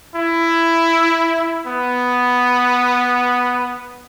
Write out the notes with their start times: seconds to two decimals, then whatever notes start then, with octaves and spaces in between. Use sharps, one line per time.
0.15 E4
1.67 B3